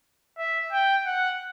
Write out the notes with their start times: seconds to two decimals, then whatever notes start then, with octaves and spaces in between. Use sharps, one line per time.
0.38 E5
0.72 G5
1.06 F#5